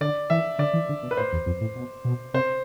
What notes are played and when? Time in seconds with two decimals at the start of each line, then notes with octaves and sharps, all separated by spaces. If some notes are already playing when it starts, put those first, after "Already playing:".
0.01 D3 D5
0.30 E3 E5
0.59 D3 D5
0.73 E3
0.89 D3
1.03 B2
1.11 B4
1.17 A2 C5
1.33 E2
1.46 F2
1.61 A2
1.75 B2
2.05 B2
2.34 C3 C5